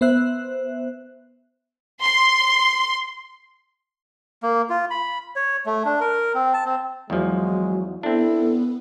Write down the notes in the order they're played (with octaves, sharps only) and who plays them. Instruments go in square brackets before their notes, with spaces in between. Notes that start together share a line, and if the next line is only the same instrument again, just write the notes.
[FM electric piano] B3 C5 E5 F#6
[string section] C6
[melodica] A#3
F4
B5
C#5
A3
D4
A#4
C4
A5
C4
[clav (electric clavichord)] E2 F3 [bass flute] F#3 [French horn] G#3
[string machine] B3 [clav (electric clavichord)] C4 D4 [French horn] E4 [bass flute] A4